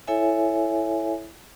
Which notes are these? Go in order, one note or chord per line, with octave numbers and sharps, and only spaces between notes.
E4 A4 C#5 E5 G#5